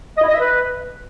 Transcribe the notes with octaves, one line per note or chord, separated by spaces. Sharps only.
D#5
E4
D#5
E5
B4